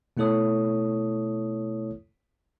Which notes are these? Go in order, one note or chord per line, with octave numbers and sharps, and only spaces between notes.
B2 A3 E4 A4 C#5 D#6